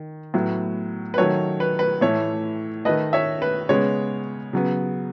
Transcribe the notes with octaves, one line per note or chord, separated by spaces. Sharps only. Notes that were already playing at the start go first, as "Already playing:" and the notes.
Already playing: D#3
A2 F#3 B3
B4
D#3 F#3 A3 C#5
B4
B4
A2 E3 A3 C#5
D#3 A3 B4 D#5
C#5 E5
B4
C#3 G#3 B3 C#5
C#3 F#3 B3